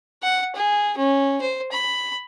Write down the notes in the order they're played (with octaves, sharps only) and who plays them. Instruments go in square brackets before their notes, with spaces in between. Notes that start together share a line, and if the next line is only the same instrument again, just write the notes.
[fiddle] F#5
G#4
C#4
C5
B5